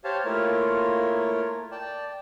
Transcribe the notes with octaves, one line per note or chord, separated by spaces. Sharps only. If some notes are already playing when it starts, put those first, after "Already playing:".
G4 C5 C#5 F5 A5
A3 A#3 E4 F4 A#4 C#5
D5 G5 A5